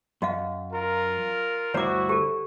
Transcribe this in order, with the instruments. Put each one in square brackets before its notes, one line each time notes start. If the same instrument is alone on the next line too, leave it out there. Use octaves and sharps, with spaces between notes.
[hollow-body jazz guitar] F#2 [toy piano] F#4 D#5 F5
[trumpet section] F4 A#4
[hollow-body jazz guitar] D2 G2 C5 [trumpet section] E4 F#4 [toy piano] C#5 D6
[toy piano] G4 A4